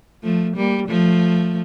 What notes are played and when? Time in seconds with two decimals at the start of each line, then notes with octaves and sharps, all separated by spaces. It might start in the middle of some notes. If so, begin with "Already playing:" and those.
0.23 F3 A3
0.56 G3 A#3
0.88 F3 A3